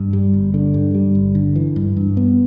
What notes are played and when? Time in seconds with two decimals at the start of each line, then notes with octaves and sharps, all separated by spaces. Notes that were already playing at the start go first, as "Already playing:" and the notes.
Already playing: G2
0.13 G3
0.33 G1
0.54 D3
0.74 G2
0.95 G3
1.15 G1
1.35 D3
1.56 E3
1.76 G2
1.97 G2
2.17 B3